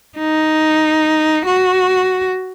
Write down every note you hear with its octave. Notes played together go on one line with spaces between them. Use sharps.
D#4
F#4